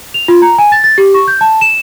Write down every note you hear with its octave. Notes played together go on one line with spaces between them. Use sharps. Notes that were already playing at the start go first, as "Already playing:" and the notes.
F7
F4
A#5
G#5
A6
A6
G4
C#6
G6
A5
E7